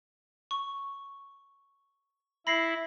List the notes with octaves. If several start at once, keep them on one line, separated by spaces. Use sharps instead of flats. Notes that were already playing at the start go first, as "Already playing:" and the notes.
C#6
E4 B5 A#6 C7